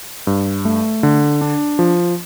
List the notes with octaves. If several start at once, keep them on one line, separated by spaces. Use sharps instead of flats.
G2
A3
D3
D4
F3